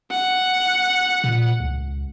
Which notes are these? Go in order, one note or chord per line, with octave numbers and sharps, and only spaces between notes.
F#5
A#2
C#2